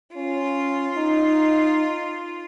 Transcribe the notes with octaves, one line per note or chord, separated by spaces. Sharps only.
C#4 F4
D#4